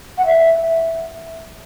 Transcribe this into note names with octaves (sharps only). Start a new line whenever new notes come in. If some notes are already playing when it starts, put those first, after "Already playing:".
F#5
E5